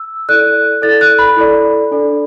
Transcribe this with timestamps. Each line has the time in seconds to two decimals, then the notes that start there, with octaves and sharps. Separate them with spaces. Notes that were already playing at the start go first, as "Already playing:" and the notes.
Already playing: E6
0.29 E4 A4 D5 F#6
0.82 E4 A4 D5 A6
1.01 F#6
1.19 B5
1.36 E4 A4 D5
1.91 D4 A4 D5